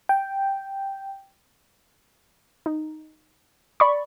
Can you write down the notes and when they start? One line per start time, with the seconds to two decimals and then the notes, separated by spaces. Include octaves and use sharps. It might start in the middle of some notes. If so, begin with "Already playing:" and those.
0.09 G5
2.66 D#4
3.80 D5 B5 C#6